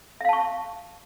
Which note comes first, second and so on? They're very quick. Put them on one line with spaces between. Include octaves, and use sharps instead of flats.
E5 F5 A5 C#6